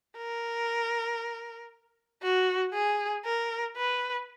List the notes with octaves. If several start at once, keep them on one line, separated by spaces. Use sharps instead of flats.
A#4
F#4
G#4
A#4
B4